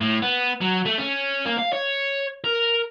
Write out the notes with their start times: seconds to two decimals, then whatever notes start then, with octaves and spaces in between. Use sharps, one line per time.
0.01 A2
0.22 B3
0.61 F#3
0.85 A3
0.98 C#4
1.46 A#3
1.59 F5
1.73 C#5
2.44 A#4